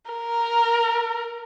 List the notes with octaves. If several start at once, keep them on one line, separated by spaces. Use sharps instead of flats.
A#4